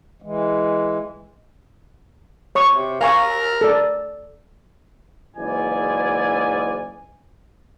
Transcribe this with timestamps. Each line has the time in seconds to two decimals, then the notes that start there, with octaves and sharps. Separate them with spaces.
0.22 E3 G#3
2.55 C#5 C#6 D#6
2.73 C3
3.01 A#4 F5 G#5 C#6
3.61 A4 D5
5.36 F#1 G#2 E3 D5 G#5